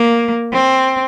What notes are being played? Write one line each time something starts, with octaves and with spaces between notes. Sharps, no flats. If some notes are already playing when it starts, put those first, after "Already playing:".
Already playing: A#3
C4